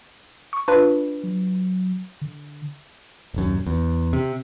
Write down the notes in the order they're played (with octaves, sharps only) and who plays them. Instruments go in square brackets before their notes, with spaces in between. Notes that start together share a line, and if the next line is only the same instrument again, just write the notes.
[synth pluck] C#6
D4 F4 B4
[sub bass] F#3
D3
[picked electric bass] D#1 F#2
E2
C3